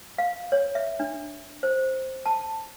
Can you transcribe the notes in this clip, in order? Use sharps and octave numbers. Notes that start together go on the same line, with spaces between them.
F5
C#5
E5
D4
C5
A5